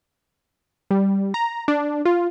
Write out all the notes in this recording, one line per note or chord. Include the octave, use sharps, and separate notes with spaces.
G3
A#5
D4
F4